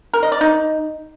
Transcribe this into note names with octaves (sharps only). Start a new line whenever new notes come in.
A#4
D#5
D5
D#4